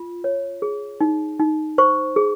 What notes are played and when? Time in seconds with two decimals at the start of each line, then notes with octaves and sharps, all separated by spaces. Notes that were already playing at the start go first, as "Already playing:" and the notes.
Already playing: F4
0.24 C#5
0.62 G#4
1.01 D#4
1.40 D#4
1.78 C5 C#6
2.16 G#4